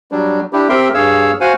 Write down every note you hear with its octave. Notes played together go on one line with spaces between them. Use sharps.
F#3 G3 D4
D4 E4 G4
C4 G4 A#4 E5 G5 C6
G2 G#4 C#5 F5 E6
F#4 C5 F5 F#5 G#5